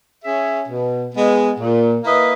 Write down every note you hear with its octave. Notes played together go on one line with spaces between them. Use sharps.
C#4 G#4 C#5 E5
B2
G#3 B3
A#2
A#3 E4 B4 D#5